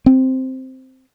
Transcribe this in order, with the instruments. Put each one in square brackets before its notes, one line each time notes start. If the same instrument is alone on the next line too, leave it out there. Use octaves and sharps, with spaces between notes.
[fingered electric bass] C4